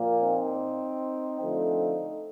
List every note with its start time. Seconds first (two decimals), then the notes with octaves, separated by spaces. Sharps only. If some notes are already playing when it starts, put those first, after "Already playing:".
Already playing: A#2 F3 A#3
0.22 C4 D#4
1.41 D3 F3 A3 C4